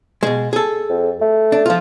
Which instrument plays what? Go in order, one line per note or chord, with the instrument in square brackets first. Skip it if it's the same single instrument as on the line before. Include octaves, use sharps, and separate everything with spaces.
[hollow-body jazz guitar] B2 G#3
G#4 A4
[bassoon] F2
A3
[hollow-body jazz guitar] D4
F3 F4